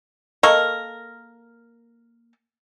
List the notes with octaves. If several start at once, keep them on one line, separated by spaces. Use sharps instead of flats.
A#3 A4 A#4 D#5 C#6